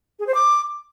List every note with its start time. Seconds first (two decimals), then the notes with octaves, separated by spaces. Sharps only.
0.19 G#4
0.27 C5
0.34 D6